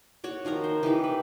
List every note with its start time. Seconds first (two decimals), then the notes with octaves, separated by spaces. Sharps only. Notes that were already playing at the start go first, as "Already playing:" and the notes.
0.24 F#4 C#5 D6
0.45 D#3 F3 A#4 A#5
0.64 C5
0.83 E3 D#4 G4 B4
1.04 B4